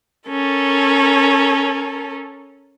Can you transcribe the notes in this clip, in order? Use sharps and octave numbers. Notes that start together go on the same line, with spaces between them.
C#4 A4 A#4